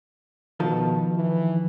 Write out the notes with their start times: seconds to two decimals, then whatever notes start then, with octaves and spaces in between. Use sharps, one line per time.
0.60 B2 D#3 F3 A4
1.16 E3